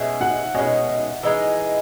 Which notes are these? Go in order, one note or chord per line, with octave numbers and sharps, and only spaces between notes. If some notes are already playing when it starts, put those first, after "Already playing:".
Already playing: B2 G#3 C#4 E5
F#5
B2 G#3 C#4 D#5
E3 G#3 D#4